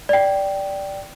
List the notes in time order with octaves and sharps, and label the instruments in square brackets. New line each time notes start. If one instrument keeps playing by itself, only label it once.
[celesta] D5 G5